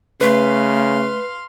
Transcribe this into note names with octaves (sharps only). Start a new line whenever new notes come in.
C#3 A3 B4 F5 C6